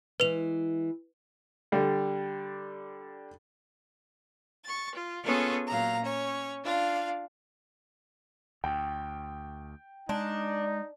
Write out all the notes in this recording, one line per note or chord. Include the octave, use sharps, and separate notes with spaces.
E3 G#3 B4 F7
D3 G3 D4
C#6 A6
F4
B3 C#4 F4 G#4 A4 C#5
A#2 F#3 F5 A#5
C#4 C#5
D4 F4 F5
D2 G5
G#3 D4 D#4